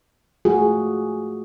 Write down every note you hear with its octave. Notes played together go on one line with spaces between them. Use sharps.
A3 F4 F#4 G#4